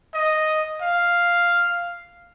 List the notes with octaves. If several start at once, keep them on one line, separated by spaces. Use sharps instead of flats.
D#5
F5